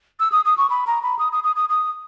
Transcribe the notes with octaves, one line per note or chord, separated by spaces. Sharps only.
E6
D#6
D#6
C#6
B5
A#5
B5
D#6
D#6
D#6
D#6
D#6